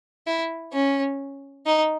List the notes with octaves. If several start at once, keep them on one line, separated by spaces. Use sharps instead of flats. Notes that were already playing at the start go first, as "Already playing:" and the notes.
E4
C#4
D#4